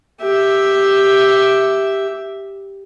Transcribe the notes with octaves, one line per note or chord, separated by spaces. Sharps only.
G4 E5